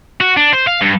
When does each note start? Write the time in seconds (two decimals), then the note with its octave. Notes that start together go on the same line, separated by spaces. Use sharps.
0.21 F#4
0.37 D4
0.53 C5
0.67 F5
0.82 G2